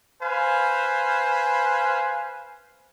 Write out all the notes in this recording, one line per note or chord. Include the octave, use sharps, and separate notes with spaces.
B4 C5 F5 G#5